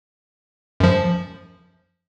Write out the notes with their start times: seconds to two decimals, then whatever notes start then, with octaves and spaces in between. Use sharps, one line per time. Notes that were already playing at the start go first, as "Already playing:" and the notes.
0.80 F#2 F3